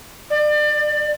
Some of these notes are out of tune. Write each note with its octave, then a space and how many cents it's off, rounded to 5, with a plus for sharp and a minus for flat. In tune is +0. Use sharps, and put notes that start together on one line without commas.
D5 +30